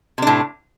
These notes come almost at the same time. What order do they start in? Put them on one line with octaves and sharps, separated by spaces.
C3 D4 A2